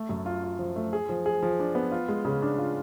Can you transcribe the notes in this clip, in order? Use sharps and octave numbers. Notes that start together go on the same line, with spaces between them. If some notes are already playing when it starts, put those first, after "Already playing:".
Already playing: A3
F#2
F4
F4
F3
A3
G#4
F3
G#4
F3
D4
B3
F4
G#3
C#3
D4
F4